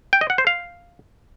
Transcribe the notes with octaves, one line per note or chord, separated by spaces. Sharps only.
G5
D#5
F#5
C5
F5